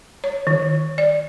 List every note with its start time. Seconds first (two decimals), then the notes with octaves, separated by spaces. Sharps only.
0.24 C#5
0.47 D#3
0.98 D5